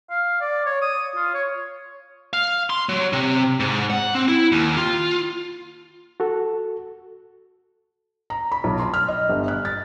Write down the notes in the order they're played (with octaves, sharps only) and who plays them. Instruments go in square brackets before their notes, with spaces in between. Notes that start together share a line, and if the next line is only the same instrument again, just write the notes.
[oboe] F5
D5
C#5
D#6
F4
C#5
[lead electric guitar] F5
C6
F#3
C3
G#2
F#5
C4
E4
D#2
F4
[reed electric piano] F#4 A4
[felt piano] A#5
B5
B1
C6
F6
D#5
G1
F#6
A6